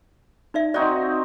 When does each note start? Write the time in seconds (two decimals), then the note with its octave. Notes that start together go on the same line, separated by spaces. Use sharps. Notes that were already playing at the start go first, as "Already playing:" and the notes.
0.54 D#4 D5 E5
0.74 C4 D#4 F#4 D5